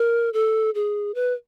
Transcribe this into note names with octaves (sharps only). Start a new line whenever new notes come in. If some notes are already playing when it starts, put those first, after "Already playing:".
Already playing: A#4
A4
G#4
B4